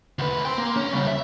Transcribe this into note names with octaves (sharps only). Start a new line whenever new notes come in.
D2 B4
G5 C6
A#3
C#4
C#3 G3
E5